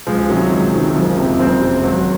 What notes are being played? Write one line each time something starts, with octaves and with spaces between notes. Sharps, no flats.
C#2 F3 G#3
G#3
C3 D#3 F#3
C#2
C3 D#3
F#1 F3 G#3
F2 C3
F#1 G#3 C4
F2 C3
G#1 F#3
F#3